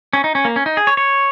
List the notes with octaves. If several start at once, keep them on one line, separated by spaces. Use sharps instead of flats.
C#4
D#4
C#4
A#3
C#4
D#4
G#4
C#5
C#5